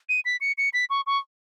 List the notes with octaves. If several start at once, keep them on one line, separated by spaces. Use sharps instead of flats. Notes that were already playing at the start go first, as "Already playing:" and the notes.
D#7
B6
C#7
C#7
B6
C#6
C#6